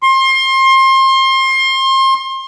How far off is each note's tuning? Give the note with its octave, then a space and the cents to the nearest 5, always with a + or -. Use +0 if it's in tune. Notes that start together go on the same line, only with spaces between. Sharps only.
C6 +30